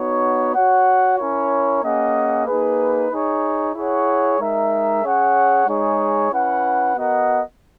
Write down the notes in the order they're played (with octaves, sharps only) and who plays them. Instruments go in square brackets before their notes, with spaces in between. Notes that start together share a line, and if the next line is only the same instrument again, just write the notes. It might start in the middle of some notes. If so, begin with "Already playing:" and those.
Already playing: [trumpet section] B3 D#4 F#4 C#5
F#4 C#5 F#5
C#4 E4 A#4 C#5
A#3 C#4 G#4 D#5 F#5
A#3 D#4 G#4 B4
D#4 G#4 C#5
E4 G#4 C#5 F#5
G#3 D#4 A#4 E5
C#4 G#4 C#5 F#5
G#3 D#4 G#4 C#5
C#4 E4 B4 F#5
B3 F#4 A#4 D#5 F#5